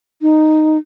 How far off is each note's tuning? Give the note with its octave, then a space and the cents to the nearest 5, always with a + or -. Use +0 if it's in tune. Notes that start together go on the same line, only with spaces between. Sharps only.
D#4 -5